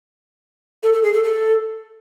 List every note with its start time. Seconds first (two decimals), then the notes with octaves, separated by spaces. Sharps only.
0.83 A4
0.93 A4
1.03 G#4
1.14 A4
1.24 A4